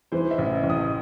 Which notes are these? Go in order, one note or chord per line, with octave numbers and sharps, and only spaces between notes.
E3 C5
E5
A1
A1
D#6